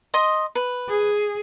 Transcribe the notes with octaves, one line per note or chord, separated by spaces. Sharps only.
D#5 C6 D#6
B4
G#4